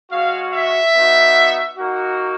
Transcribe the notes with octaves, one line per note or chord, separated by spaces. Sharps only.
G#3 C#4 F#4 F5
E5
B3 D#4 F#4
A#3 D#4 F#4